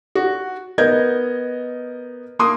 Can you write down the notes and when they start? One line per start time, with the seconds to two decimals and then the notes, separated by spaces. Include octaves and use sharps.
0.15 F#4
0.78 B3 A#4 D#5 G6 G#6
2.39 A#3 C6 D#6